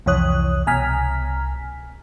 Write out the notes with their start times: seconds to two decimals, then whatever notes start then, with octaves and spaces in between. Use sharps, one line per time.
0.06 C2 F2 E3 C#5 D#6 F#6
0.67 C2 B2 G#5 A#5 F6 B6